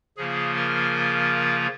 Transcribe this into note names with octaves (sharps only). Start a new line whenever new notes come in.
C#3 F3 A#3 F4 G#4
A#4